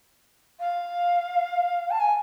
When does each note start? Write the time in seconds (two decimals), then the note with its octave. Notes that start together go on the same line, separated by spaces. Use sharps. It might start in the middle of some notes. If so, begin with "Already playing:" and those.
0.60 F5
1.90 A5
2.00 G#5